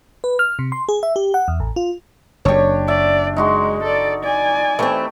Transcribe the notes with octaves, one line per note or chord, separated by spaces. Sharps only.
B4
F6
C3
C6
G#4
E5
G4
F#5
E2
A1
F4
F#1 F#2 D4 G4 C#5
D5 E5
G#3 D#4 F#4 C6
A4 D5
D5 G#5
E3 A3 C4 G4